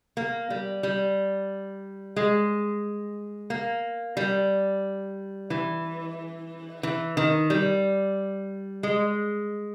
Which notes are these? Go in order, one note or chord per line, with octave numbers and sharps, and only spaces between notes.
A#3
G3
G3
G#3
A#3
G3
E3
E3
D#3
G3
G#3